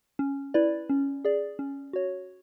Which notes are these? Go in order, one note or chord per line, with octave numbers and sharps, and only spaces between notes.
C#4
E4 B4 D5
C#4
G#4 D5
C#4
F#4 C#5